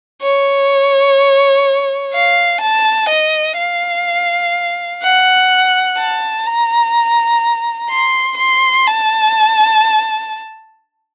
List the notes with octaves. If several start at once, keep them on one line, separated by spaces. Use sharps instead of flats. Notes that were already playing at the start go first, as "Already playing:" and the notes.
C#5
F5
A5
D#5
F5
F#5
A5
A#5
C6
C6
A5